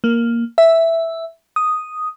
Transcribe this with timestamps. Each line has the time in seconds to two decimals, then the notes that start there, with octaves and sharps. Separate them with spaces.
0.04 A#3
0.58 E5
1.56 D#6